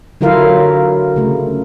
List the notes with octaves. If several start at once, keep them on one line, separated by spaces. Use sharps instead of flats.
D3 F#3 E4 F4 A#4 F5
C#3 A3